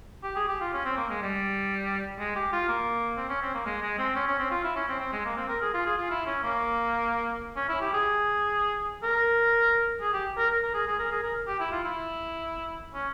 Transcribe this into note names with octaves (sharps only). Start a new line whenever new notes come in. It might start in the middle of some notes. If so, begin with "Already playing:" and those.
G4
G#4
G4
F4
C#4
C4
A#3
G#3
G3
G#3
G4
F4
A#3
C4
C#4
C4
A#3
G#3
G#3
C4
C#4
C#4
C4
F4
E4
C#4
C4
C4
G#3
A#3
C4
A#4
G#4
F4
G#4
F4
E4
C#4
A#3
C#4
E4
G4
G#4
A#4
G#4
G4
A#4
A#4
G#4
G#4
A#4
G#4
A#4
G4
E4
F4
E4
C#4